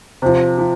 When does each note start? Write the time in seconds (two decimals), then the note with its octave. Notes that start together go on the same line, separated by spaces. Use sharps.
0.22 C3 F3
0.58 F3